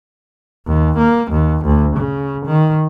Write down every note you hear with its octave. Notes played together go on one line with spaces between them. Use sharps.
D#2
A#3
D#2
D2
C#3
D#3